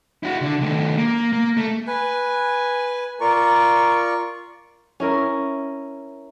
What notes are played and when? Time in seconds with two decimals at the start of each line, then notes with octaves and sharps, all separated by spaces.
0.23 E4 F#4
0.41 D3
0.61 D#3 A3
0.98 A#3
1.33 A#3
1.57 A3
1.87 B4 G#5
3.21 F4 A#4 D5 C#6
5.00 C#4 E4 A#4